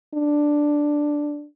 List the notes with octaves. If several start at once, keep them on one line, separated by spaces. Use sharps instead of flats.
D4